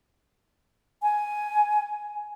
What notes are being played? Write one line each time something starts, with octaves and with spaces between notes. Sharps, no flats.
G#5